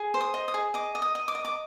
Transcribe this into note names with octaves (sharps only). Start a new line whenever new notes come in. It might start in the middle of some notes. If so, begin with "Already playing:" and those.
Already playing: G#4
C5
D#6
D#5
D#6
G#4
D#5 D6
D#5
D#6
D#5
D6
D#5
D6